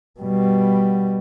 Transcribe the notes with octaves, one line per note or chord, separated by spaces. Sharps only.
B2 G3